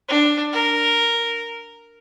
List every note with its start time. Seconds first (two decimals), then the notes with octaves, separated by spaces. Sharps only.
0.08 D4
0.53 A#4